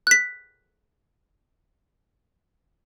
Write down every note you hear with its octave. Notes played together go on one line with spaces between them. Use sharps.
F#6 B6